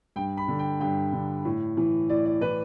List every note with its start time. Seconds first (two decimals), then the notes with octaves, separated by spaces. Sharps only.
0.16 G2 G5
0.37 B5
0.48 D3
0.59 G5
0.80 G2 G5
1.13 D3
1.45 A2
1.77 E3
2.09 A2 D5
2.25 D5
2.41 E3 B4